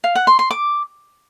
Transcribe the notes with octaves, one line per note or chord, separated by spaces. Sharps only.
F5
F#5
C6
C6
D6